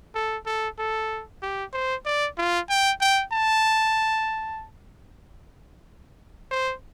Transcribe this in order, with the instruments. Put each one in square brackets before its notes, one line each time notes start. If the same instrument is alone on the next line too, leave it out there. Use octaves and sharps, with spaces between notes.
[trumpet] A4
A4
A4
G4
C5
D5
F4
G5
G5
A5
C5